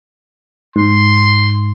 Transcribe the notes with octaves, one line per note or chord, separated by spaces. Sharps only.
G#2 C6